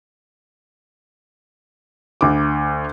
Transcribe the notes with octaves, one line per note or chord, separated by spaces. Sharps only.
D2 D6